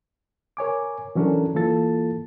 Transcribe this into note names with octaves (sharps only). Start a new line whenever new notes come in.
A#4 C#5 G#5 D6
E3 F#3 C#4 D4 A4 A#4
E3 A#3 F4 A4 A6